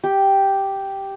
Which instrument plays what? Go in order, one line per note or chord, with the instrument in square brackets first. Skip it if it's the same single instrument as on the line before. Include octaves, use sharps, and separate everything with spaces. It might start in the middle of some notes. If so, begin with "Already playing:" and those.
[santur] G4